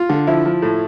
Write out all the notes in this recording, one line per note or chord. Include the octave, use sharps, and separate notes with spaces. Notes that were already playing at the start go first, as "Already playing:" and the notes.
Already playing: F4
D3
F3 E4
F3
A2